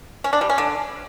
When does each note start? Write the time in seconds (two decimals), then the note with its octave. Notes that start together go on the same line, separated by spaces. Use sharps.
0.24 C#4
0.33 D4
0.41 G3
0.50 C#4
0.58 D3